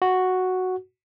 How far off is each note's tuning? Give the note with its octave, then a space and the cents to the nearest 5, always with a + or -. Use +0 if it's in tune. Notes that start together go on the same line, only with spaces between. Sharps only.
F#4 +0